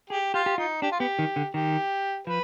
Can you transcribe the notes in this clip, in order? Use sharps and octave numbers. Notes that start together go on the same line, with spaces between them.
G4 G#4
F4 G4
G4
D#4 F4
D4 G4
F4
B3 G4
D#3
D3
D#3 G4
F3 B4